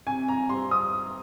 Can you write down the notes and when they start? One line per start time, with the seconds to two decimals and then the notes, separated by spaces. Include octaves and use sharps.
0.06 C3 G#5
0.28 A#5
0.49 G3 C4 C6
0.71 D#6